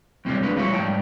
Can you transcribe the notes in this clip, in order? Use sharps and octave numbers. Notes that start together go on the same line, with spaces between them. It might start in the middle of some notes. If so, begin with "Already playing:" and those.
F2 C3 E3 G3 C#4
G#3 D4 B4
F3 G3 E4 F#4 A#4 C#5
G#2 G3 G5 A5